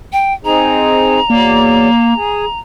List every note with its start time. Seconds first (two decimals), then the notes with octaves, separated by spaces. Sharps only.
0.13 G5
0.45 C4 D#4 G#4 A#5
1.30 E2 F#3 A#3 D5
2.16 G#4